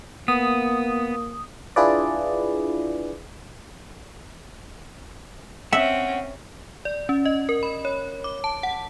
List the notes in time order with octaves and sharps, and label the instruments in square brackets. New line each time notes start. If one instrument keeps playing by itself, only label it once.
[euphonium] A#3 [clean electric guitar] B3 [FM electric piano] D#6
[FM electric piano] D4 E4 F4 G#4 B4 D5
[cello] C4 C#4 [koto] E5 [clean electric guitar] F#5
[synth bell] D5
C#4
D#5
A#4
B5
C#5
D6
A5
F#5